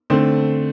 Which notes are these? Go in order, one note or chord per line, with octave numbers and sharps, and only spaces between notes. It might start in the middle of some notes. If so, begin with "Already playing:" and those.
D3 A3 C4 C5